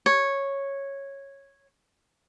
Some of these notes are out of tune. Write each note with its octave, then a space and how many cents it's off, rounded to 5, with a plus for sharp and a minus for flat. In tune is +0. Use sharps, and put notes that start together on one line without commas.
C#5 -10